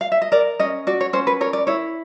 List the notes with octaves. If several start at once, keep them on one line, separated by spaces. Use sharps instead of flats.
F5
E5
D#5
A#4 D5
C#4 D#5
F#4 D5
C#5
C#4 C5
B4
A#4 C#5
D5
E4 C#5